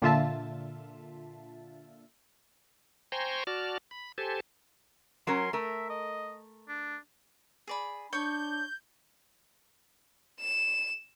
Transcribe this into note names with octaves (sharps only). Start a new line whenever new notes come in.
A#2 D3 F4 E5 A5
C5 G5 G#5 A#5 C6 C#6
F#4 D5 A5 F6
B5
G4 A4 C5 G#5 A5
F#3 C#4 A#4 C6
A3 A#4 E5
D#5
D4
G#4 D5 B5
D4 C#5 C#6 G6
E7